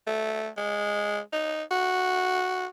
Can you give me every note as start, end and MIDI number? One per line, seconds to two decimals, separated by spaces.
0.07 0.49 57
0.57 1.19 56
1.32 1.63 63
1.71 2.66 66